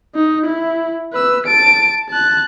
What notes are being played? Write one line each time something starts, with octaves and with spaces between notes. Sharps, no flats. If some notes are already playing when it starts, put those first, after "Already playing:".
D#4
E4
B4 E6
A5 D7
A5 F#6